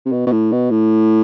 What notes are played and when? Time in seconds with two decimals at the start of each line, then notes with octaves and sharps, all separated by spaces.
0.05 C3
0.12 B2
0.27 B2
0.32 A2
0.52 B2
0.70 A2